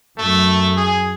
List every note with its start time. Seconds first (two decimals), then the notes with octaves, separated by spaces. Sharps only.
0.18 F#2 A3
0.77 G#4